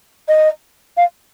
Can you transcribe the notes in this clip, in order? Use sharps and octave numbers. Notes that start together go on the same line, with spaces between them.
D#5
F5